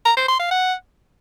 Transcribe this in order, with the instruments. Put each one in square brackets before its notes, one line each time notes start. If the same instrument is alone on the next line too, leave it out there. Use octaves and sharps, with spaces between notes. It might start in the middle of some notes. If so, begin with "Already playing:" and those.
[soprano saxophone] A#5
C5
C6
F5
F#5